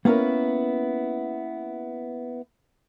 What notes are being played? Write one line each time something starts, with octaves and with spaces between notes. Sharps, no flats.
A#3 B3 C#4 E4 A#4